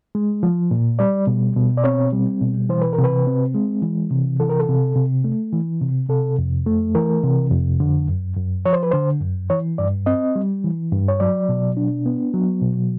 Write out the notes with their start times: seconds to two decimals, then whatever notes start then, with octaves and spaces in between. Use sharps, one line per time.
0.15 G#3
0.43 F3
0.71 A#2
0.99 G3 D5
1.27 B2
1.56 B2
1.77 D5
1.84 C4 C#5
2.13 G3
2.41 B2
2.69 E3 C5
2.82 B4
2.93 A#4
2.98 C3
3.04 B4
3.27 C4
3.55 G#3
3.82 E3
4.11 C3
4.40 E3 A4
4.49 A#4
4.60 A4
4.69 C3
4.96 C3
5.24 A3
5.52 E3
5.81 C3
6.09 C3 A4
6.38 F2
6.66 A3
6.95 E3 A#4
7.23 C3
7.51 F2
7.80 D3
8.08 F#2
8.37 F#2
8.66 F3 C#5
8.73 C5
8.83 B4
8.91 D3 C5
9.21 F#2
9.50 E3 C#5
9.78 G2 D5
10.06 C4 D#5
10.36 G3
10.64 E3
10.92 G2
11.08 C#5
11.20 F#3 D5
11.49 B2
11.77 D4
12.06 B3
12.34 F#3
12.61 B2